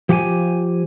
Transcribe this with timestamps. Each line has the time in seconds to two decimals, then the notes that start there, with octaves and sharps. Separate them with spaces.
0.09 F3 G4 F#5 G#5